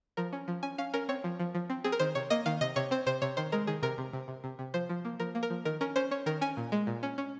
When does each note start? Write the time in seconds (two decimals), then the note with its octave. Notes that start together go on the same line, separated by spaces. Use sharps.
0.17 F3 A#4
0.33 C#4
0.48 F3
0.63 C#4 G#5
0.78 C#4 F5
0.94 C#4 A#4
1.09 C4 C#5
1.24 F3
1.40 F3
1.55 F3
1.70 C4
1.84 C4 G#4
1.92 A#4
2.00 D#3 C5
2.15 C3 C#5
2.30 A#3 D#5
2.46 D#3 F5
2.61 C3 D#5
2.76 C3 C#5
2.91 C4 C5
3.06 C3 C5
3.22 C3 C#5
3.37 D#3 C5
3.52 G#3 A#4
3.67 D#3 G#4
3.83 C3 A#4
3.98 C3
4.13 C3
4.28 C3
4.44 C3
4.59 C3
4.74 F3 C5
4.89 F3
5.05 A#3
5.19 F3 A#4
5.35 A#3
5.43 A#4
5.50 F3
5.65 D#3 A#4
5.81 C#4 A#4
5.96 C#4 C5
6.11 C#4 C#5
6.26 D#3 A#4
6.41 C#4 G#5
6.57 A#2
6.72 G#3
6.87 A#2
7.03 C#4
7.18 C#4